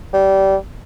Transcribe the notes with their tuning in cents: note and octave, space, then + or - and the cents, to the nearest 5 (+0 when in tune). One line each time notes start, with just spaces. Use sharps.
G3 -20